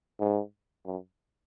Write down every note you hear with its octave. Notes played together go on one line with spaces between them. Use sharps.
G#2
F#2